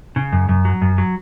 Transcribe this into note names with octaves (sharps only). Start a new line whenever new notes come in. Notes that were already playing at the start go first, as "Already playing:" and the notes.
C#3
F#2
F#2
F#3
F#2
F#3